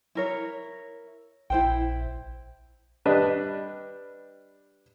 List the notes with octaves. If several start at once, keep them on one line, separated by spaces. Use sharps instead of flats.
E4 A#4 C#5
A#1 E4 C5 G5
G3 D4 B4 D#5